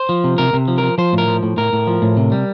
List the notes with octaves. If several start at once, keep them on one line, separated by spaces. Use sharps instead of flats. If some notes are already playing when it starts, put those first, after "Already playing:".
Already playing: C5
F3
C3
C3 A#4
C3
F3
A#4
F3
F3 C5
A2
A#4
F3
A2
A2 A#4
A2
F3
A2
C3
G3